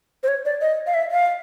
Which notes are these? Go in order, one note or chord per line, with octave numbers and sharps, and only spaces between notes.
C5
C#5
D5
D#5
F5
E5
F5